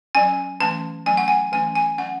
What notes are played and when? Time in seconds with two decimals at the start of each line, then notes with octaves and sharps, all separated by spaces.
0.15 F#3 C#4 G#5
0.60 E3 A3 C#4 A5
1.06 F#3 A3 C#4 G#5
1.17 F#5
1.28 G#5
1.52 E3 A3 C#4 G#5
1.75 G#5
1.98 F#3 C#4 F#5